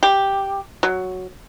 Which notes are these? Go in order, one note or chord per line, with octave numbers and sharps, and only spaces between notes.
G4
F#3